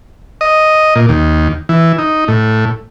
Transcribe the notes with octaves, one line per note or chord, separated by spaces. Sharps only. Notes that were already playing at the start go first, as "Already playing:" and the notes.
D#5
A#2
D#2
E3
D#4
A2